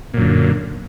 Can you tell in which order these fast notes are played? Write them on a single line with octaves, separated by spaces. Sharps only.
A#2 F#2 D3